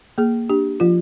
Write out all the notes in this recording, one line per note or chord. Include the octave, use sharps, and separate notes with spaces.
A#3 G#4
D4 G4
F3 F4